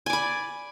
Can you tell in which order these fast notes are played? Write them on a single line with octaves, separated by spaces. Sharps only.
G#5 D5 B5